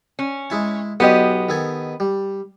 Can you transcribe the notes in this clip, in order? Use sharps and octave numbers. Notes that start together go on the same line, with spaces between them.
C#4
G#3 E4 A5
B1 B3 F#4 G4 D#5 C6
D#3 A4 G#5
G3